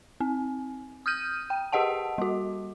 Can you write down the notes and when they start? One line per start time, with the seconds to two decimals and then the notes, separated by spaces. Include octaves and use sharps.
0.20 C4
1.06 D#6 F6 G6 D#7
1.50 G5
1.72 G4 G#4 D#5 F#5 A5
2.18 G3 F#4